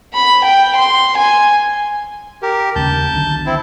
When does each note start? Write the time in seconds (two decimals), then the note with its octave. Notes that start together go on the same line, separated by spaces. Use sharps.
0.14 B5
0.44 G5
0.76 C6
1.17 G#5
2.42 G4 A#4
2.76 D#2 C#3 C#4 A5 G6
3.13 B1 D3 D#3
3.46 C4 E4